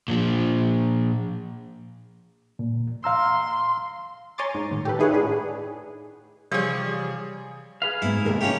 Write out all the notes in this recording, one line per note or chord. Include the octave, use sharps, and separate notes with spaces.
A#2 F3
A#2
F5 A#5 C6 E6
C#5 G#5 A#5 C6 D6 A6
G#2
A2 D#3
G4 A4 B4
D#4 E4 G#4 B4 C#5 F#5
A2 D4 G#4
C3 E3 F3 G3 G#4 C#5
G#4 B4 F5
G#2 B3 E4
D#2 A2 C3 G#4 A#4
C#4 F4 G4